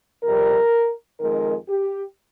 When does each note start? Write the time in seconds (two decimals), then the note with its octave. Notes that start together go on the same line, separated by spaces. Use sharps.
0.24 F2 C3 G3 A#4
1.20 F2 D#3 G#3 A#4
1.69 G4